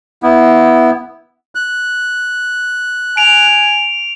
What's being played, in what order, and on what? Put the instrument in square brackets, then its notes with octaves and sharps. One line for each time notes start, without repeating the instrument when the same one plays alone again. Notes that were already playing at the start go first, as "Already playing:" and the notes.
[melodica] B3 E4
[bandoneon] F#6
[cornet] G#5 [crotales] D7 F7